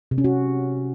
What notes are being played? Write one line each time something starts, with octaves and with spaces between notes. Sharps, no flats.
C3
C#4
F#4